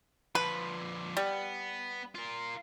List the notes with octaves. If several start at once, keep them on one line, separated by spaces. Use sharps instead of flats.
D3 F3 B4
G3 B3
F4 A#4